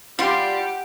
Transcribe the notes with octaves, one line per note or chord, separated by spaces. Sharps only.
G3 F4 G4 F#5 C6